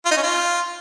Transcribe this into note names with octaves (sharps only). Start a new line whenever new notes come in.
F4
D#4
C#4
F4